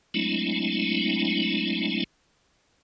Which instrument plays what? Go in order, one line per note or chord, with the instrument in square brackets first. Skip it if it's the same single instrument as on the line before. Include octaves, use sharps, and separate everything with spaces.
[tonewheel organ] F#3 G#3 A3 C4 D4 E4